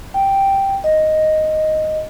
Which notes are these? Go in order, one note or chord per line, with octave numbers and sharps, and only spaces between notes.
G5
D#5